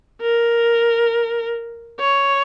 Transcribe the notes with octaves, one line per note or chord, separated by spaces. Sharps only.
A#4
C#5